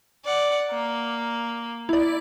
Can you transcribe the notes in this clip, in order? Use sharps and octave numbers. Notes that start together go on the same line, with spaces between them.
D5 F#5
A#3
E4 D5